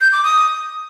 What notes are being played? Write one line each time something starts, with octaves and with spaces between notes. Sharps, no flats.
G6
D6
D#6